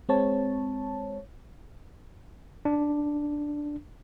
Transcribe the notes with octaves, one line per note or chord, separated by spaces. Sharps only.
G#3 C4 C#5 A5
D4